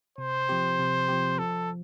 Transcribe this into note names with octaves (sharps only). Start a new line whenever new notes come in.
C3 C5
F3 C4 G4
C3
F3 C4 G4
F3 A4